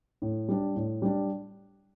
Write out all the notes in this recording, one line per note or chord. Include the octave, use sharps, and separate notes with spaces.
A2
G3 D4
A2
G3 D4